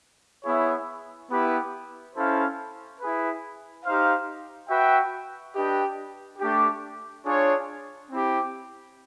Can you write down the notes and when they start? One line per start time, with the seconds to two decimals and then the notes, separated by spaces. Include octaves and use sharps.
0.45 B3 E4 G#4 C#5 E5
1.30 B3 E4 G4 B4
2.15 C#4 E4 A4 C5 F5
2.99 E4 G#4 B4
3.85 D#4 G4 C5 F5
4.69 F#4 B4 E5 G5
5.54 D4 G4 B4 D#5 G5
6.39 A3 D4 G4
7.24 D4 F4 G#4 C#5
8.09 C4 E4 G4